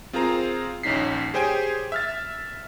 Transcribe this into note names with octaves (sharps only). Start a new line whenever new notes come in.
C4 F4 G#4 A#4 C5 A#5
A#1 D#2 C#4 D#4 B6 C7
G4 G#4 C5 C#5 G5 G#5
E5 F6 A6